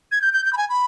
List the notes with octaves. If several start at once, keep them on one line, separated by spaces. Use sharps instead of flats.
G#6
G6
G6
G6
B5
G#5
B5